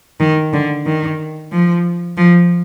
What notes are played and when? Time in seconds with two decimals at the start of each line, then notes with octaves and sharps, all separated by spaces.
0.20 D#3
0.53 D3
0.86 D#3
1.52 F3
2.17 F3